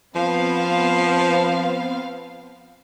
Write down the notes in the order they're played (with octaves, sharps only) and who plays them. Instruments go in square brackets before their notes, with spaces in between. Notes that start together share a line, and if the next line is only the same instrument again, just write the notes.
[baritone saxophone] F3 [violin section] B3 C4 F5